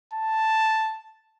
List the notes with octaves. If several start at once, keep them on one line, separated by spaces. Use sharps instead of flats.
A5